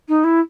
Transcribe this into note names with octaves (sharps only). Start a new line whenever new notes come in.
D#4
E4